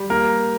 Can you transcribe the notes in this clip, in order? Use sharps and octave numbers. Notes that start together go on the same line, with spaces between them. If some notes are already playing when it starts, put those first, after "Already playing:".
Already playing: G3
A#3 A#4